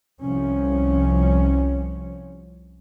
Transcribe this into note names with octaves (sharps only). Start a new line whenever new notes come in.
C2 F3 C#4